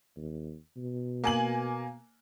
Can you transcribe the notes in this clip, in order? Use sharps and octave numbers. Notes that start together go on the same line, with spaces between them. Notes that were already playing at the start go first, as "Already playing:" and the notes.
D#2
B2
A#3 G#5 F#7